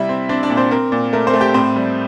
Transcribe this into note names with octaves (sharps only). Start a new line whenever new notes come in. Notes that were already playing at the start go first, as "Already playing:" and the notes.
Already playing: C3 G3 E4 E5
C4
C4 D4 D5
D4 D5
A#2
C4 C5
C4 A#4
A#2
A3 A#4
C4 C5
A3
G4 G5
A2 C4 C5
G3